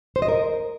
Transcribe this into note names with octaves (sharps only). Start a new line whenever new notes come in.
C5
D#5
A#4